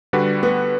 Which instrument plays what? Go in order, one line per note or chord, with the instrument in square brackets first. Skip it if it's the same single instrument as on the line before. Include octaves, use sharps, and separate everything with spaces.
[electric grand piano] D3 G3 D4 F#4 B4
[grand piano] B3